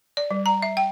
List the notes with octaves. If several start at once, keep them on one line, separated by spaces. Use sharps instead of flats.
D5
G3
A#5
E5
G5